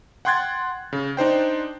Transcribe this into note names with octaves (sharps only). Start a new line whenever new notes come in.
F#5 G5 C6 F#6 G#6 A6
C#3
D4 D#4 C5 G5